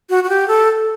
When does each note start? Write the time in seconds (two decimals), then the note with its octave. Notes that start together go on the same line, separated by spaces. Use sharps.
0.10 F#4
0.24 F#4
0.29 G4
0.48 A4